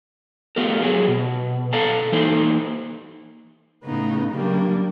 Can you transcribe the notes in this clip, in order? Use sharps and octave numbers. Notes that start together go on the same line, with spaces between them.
A3 B3 F4 G4 A#4
F#3 B3 G#4
B2
A4 D5 F5 A5 A#5
E3 A#3 D#4 C5
A2 C#3 B3 D#4
C#3 F#3 G3 A#3 D4